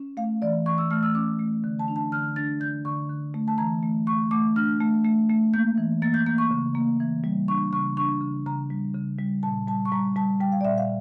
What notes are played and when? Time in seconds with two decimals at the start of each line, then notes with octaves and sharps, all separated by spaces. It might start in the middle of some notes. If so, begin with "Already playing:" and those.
Already playing: C#4
0.17 A3 F5
0.42 E3 D5
0.66 E3 C#6
0.78 E6
0.91 A3 F6
1.03 E6
1.15 C#4 D6
1.39 A3
1.64 D3
1.79 A5
1.88 D4
1.96 A5
2.12 D3 F6
2.36 D4 A6
2.61 D3 G6
2.85 D3 C#6
3.09 D3
3.34 A3
3.48 A5
3.58 E3 A#5
3.83 A3
4.07 A3 C#6
4.31 A3 D6
4.56 D4 F6
4.80 A3
5.05 A3
5.30 A3
5.54 A#3 G6
5.78 E3
6.02 A#3 A6
6.14 G6
6.26 A#3 G6
6.38 C#6
6.51 C#3
6.75 A#3
7.00 E3
7.24 G3
7.48 D4 C#6
7.73 C#3 C#6
7.97 D4 C#6
8.21 C#3
8.46 C#3 A#5
8.70 G3
8.95 C#3
9.19 G3
9.43 A#2 A5
9.67 G3 A5
9.85 C#6
9.92 G3 A#5
10.16 G3 A5
10.40 G3 G5
10.52 F5
10.61 D5
10.65 A#2 E5
10.78 F5